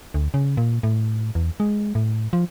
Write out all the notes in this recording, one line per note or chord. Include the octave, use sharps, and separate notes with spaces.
D2
C#3
A#2
A2
E2
G#3
A2
F3